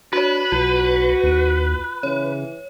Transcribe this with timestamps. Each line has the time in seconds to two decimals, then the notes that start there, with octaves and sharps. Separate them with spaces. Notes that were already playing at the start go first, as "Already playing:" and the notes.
0.13 D4 F#4 B4 C#5
0.52 B1 F4 F#4
1.24 D#2
2.03 C#3 E3 C#5